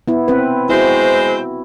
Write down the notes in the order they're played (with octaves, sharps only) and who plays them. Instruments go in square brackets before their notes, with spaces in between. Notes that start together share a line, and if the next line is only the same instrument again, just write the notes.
[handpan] B3 E4
C4 B4
[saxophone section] G#3 C4 C5 [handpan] E4 F#4